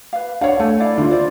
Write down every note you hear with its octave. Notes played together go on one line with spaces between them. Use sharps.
B4 F5
D4 C#5 F5 F#5
A3 G#5
E4 D5 F5
D3 F4
C5 D5